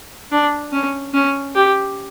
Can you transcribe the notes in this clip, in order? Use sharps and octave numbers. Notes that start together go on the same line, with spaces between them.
D4
C#4
C#4
G4